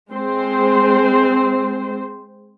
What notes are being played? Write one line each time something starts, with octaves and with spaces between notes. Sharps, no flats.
G#3 C4 C5